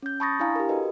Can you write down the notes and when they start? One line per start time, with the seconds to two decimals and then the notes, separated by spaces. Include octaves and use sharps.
0.03 C#4 G6
0.20 A5 B5 C#6 D#6 A6 A#6
0.40 D4 E4 F5 G#5 A#5
0.56 G4 A#4
0.69 F#4 A4 B4 D#5